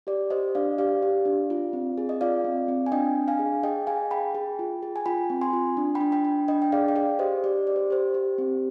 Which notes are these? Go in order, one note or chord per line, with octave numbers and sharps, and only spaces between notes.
G4 D5
G4 C5 D#5
D4 D5 F5
G4 D5 F5
G4
D4
F4
C4
G#4
D#5
F4 D5 F5
C4
C4
G#5
D4 D#5 G5
D4
F5 G#5
G#4
G#4 D#5 G5
G#4 F5 G#5
G#4 G5 B5
G#4
F4
G#4
G#5
F4 G5 B5
C4
G#5 C6
F4
D4
G5 B5
D4
G5 B5
D4
D4 D#5 G5
G5
G#4 D5 F5
G5
G#4 D5 F5
G4 C5 D#5
G4 D5
G4 D5
C5
G4 C5
G4
C4